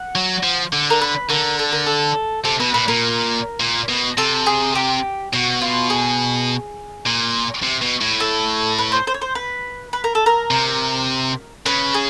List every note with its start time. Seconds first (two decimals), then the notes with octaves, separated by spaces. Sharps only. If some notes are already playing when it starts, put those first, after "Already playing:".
Already playing: F#5
0.15 F#3
0.43 F3
0.73 D3
0.90 A#4
1.01 B4
1.29 D3 A#4
1.59 A4
1.72 A#4
1.86 A4
2.45 C3 A4
2.60 B2 B4
2.74 A#2 B4
2.88 A#2 A#4
3.60 A#2
3.89 B2
4.18 C3 A4
4.46 G#4
4.75 G4
5.33 B2 F#4
5.61 F4
5.90 G#4
7.06 A#2
7.63 C3
7.82 B2
8.01 A2
8.20 A4
8.78 B4
8.92 C5
9.07 C5
9.14 C#5
9.22 C5
9.35 B4
9.93 B4
10.04 A#4
10.15 A4
10.26 A#4
10.51 C3
11.66 C#3 B4
11.94 G#4